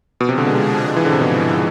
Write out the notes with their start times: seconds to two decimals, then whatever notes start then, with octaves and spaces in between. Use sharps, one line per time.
0.20 B2 F3 G#3 D4 G#4
0.29 C3
0.38 D3
0.47 B2
0.53 C3
0.88 G#2 F3 G#3
0.96 E3
1.05 D3
1.12 C3
1.21 B2